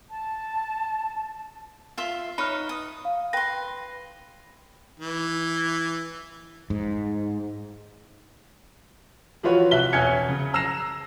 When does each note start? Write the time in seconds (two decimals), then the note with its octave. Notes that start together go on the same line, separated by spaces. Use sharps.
0.10 A5
1.98 F4 E5 C6
2.38 D#4 B4 C#5 B5 F6
2.69 D#6
3.05 F5
3.33 B4 G5 C6 A#6
5.00 E3
6.70 G#2
9.43 E3 F3 F4 F#4 B4 C#5
9.71 C2 E5 F#6 B6 G7
9.93 E1 C#4 G#5 F6 G#6 C#7
10.29 C#3
10.54 A#5 E6 A#6 C7 E7